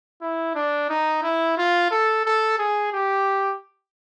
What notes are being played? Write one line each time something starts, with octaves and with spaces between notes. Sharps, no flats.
E4
D4
D#4
E4
F4
A4
A4
G#4
G4